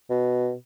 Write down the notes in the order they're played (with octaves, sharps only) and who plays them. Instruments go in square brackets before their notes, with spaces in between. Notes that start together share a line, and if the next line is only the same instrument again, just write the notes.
[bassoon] B2